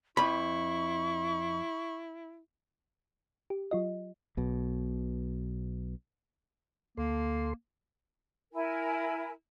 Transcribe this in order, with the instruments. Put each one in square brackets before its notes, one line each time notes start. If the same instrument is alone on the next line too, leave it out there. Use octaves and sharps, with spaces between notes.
[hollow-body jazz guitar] F2 B5 [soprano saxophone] E4 [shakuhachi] C#6
[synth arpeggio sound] G4
F#3 F4 D#5
[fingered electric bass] B1 B2
[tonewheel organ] D2 A4 C6 [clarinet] A#3
[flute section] E4 A#4 G#5